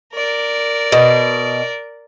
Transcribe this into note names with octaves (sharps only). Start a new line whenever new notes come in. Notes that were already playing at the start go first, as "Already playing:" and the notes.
A#4 D5
B2